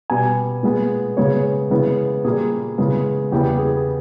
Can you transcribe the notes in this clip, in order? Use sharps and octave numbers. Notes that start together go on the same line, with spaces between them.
B2 G3 B3 G#5
A#2 G#3 B3
C#3 G#3 B3 C#5
C#3 E3 G#3 B3
A#2 G3 A#3 G#4
C#3 E3 G#3 B3
E2 C#3 G3 B3 G4
G#4